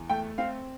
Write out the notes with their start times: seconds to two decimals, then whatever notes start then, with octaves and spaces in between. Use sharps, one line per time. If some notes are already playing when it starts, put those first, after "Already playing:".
Already playing: E2
0.09 A3 G5
0.38 C4 F5